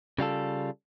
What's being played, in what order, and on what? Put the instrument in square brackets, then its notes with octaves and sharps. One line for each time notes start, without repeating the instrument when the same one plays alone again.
[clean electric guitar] C#3 G3 F4 A4